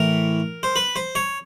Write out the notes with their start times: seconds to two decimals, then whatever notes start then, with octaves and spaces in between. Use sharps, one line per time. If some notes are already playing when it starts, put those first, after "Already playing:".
Already playing: A2 E3 A#4
0.63 C5
0.76 B4
0.96 C5
1.15 C#5